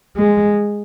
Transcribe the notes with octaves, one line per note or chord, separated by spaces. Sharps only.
G#3